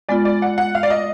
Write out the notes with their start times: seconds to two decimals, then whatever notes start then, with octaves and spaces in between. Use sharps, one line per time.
0.09 G#3 B3 F4 D5
0.25 D5
0.42 F#5
0.58 F#5
0.75 F5
0.83 D5
0.90 D#5